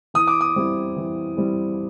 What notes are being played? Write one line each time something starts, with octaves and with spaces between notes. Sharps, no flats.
E3 D#6
D6
D#6
G3 C4 E4
E3
G3 C4 E4